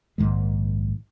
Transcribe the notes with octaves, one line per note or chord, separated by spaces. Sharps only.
A#1 G#2 D#3 G#3